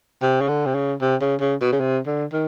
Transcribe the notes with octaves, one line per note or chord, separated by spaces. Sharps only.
C3
C#3
D3
C3
C#3
C3
C#3
C#3
B2
C#3
C3
D3
D#3